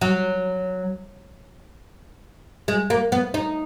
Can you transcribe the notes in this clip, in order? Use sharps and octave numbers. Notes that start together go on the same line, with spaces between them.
F#3
G#3
A#3
B3
D#4